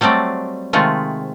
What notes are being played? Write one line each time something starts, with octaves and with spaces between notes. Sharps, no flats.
F#3 G3 A3 C4 D5
C3 D#3 G#3 A3 F4